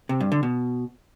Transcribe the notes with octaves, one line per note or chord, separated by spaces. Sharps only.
C3
G2
D3
B2